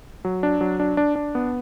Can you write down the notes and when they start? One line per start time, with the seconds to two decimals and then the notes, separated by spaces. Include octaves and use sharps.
0.25 F#3
0.43 D4
0.61 F#3
0.80 D4
0.97 D4
1.16 D4
1.35 B3